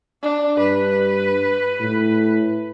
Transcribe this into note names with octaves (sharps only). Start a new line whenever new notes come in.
D4
G2 B4
A2